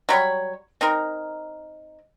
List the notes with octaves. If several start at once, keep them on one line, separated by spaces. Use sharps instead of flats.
F#3 G3 C#5 B5
C4 D#4 A#4